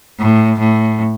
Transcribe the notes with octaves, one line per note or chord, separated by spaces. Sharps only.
A2
A2